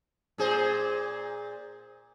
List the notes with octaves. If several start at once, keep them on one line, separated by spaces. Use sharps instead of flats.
A#2 G#4 C5